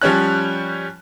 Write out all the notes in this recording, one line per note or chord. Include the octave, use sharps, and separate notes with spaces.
F3 G3 C#4 C#5 F#6